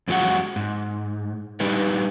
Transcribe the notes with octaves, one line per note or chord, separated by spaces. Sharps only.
F2 D3 F#3 G#3 F#4 F#5
G#2
G3 D4 D#4 G4 B4